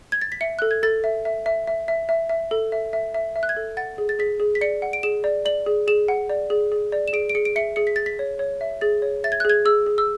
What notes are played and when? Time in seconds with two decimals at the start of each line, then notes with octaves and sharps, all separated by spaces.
0.12 G#6
0.21 A6
0.32 B6
0.41 E5 C#7
0.59 A4 F#6
0.71 G#6
0.83 A4 A6
1.04 E5
1.25 E5
1.46 E5
1.67 E5
1.88 E5
2.09 E5
2.29 E5
2.51 A4
2.72 E5
2.93 E5
3.15 E5
3.36 E5
3.43 F#6
3.49 G#6
3.56 A4
3.77 F#5 A6
3.98 G#4
4.09 A6
4.19 G#4 B6
4.40 G#4
4.55 B6
4.61 D5 C#7
4.82 F#5
4.93 D7
5.03 G#4 E7
5.24 D5
5.45 D5 F#7
5.66 G#4
5.88 G#4 E7
6.08 F#5
6.29 D5
6.50 G#4
6.72 G#4
6.92 D5
7.08 E7
7.13 G#4 D7
7.29 D7
7.35 G#4 C#7
7.45 D7
7.56 E5 C#7
7.76 G#4 C#7
7.87 B6
7.96 G#4 A6
8.06 B6
8.19 C#5
8.39 C#5
8.61 E5
8.81 G#4 A6
9.02 C#5
9.24 E5 A6
9.32 G#6
9.40 F#6
9.45 G#4 G#6
9.65 G#4 E6
9.86 G#4
9.98 E6